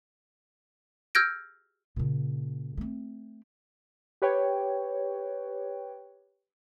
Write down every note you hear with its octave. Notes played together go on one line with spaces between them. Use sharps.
E6 F6 G6 G#6 A#6 D7
A#2 C#3
A3 C4
G4 B4 C#5 G5